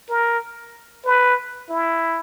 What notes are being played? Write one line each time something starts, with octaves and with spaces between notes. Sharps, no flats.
A#4
B4
E4